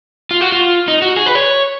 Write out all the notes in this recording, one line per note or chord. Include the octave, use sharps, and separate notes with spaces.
F4
F#4
F4
D#4
F#4
G#4
B4
C#5